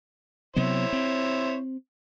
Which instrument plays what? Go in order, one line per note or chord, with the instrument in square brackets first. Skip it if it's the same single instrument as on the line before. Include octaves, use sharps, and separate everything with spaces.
[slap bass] C3 F#3 B3 [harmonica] E4 C5 C#5
[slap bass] C4